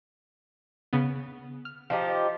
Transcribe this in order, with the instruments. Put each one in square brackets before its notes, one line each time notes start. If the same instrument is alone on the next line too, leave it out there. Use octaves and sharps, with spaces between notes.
[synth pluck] C#3 B3
F6
[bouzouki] F3 D#4 G4